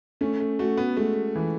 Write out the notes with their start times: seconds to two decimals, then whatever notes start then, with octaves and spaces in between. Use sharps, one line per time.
0.21 A3 C#4
0.40 A3
0.59 A3 F#4
0.77 B3
0.97 G#3 A3
1.35 E3